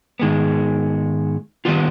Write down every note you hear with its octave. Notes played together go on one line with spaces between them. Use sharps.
G#2 D#3 G#3 B3
D#3 G3 B3 F4